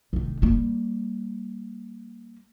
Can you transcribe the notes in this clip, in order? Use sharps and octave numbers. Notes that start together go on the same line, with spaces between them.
F1 D#3
G3 A#3